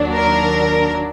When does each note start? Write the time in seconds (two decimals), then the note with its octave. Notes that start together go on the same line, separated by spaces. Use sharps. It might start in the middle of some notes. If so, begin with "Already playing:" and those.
Already playing: D#2 D#3 F#3 D4
0.14 A#4